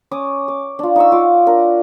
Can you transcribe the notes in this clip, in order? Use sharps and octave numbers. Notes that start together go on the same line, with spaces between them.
C#4 D6 D#6
D6
D4 F4
D#4 F#5 C#6 E6
F4 D6
D4 A#4